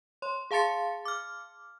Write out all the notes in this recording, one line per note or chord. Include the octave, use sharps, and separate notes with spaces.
C#5 C6
G#4 F5 A5 C6 A6 C#7
D6 F6